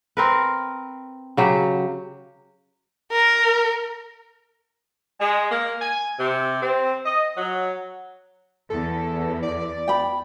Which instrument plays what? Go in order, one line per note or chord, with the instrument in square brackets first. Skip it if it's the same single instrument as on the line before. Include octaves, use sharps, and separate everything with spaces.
[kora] C4 A#4 B4
C#3 F#3 G4
[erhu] A#4
[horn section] G#3
A#3
G#5
C3
C4
D#5
F#3
[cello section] E2 [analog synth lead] A4
[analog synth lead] D5
[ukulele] G5 B5